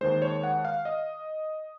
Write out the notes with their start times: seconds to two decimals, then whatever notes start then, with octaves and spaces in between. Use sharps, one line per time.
0.01 D#2 D#3 G#3 C5
0.22 C#5
0.43 F#5
0.65 F5
0.85 D#5